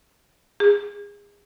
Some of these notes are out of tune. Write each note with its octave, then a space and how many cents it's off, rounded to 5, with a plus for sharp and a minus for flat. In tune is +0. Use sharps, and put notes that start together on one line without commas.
G#4 -30